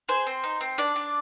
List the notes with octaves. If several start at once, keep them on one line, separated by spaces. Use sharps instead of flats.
G#4 C5
C4
D#4
C4
D4 D5
D4